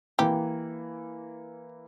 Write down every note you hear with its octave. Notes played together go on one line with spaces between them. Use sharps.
E3 A#3 G4